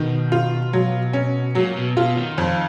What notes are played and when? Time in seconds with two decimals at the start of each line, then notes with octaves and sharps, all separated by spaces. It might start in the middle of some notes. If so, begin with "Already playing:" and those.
Already playing: B2 D#3
0.32 F4
0.73 F#3
1.13 C#4
1.55 A#2 F#3
1.76 B2
1.97 B2 F4
2.16 D#3
2.38 F2